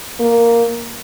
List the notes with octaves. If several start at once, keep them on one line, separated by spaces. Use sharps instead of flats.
A#3